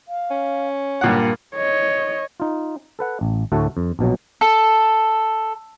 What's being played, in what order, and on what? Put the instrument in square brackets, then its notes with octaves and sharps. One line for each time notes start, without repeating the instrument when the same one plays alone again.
[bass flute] F5
[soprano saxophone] C#4
[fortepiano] G2 A#2 F#5 [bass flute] A#3
[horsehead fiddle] C#5 D#5
[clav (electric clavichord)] D#4 F4
A4 B4 F#5
A1
D2 A2 A3 F#4 A4
F2
A#1 B2 F#3
[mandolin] A4